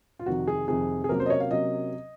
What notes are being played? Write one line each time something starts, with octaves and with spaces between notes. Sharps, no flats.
F4
F2 C3 D#3 F#4
G#4
F2 C3 D#3 G#4
G#4
C3 F#3 A#3 C#4 A#4
C5
D#5
C#5
F5
C3 F#3 A#3 C#4 D#5